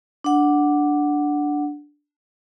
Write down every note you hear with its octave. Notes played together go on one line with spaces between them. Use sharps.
D4 F#5